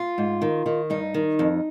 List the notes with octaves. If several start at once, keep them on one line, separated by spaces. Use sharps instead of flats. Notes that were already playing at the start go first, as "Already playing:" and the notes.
Already playing: F4
G#2
D#3
D#3
G2 D#4
D#3
F2